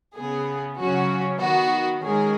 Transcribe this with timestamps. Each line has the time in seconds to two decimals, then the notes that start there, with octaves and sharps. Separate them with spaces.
0.16 C#3 B3 G#4
0.78 C#3 F#3 C#4 F#4
1.41 D#3 B3 F#4
2.04 D#3 G#3 C#4 G#4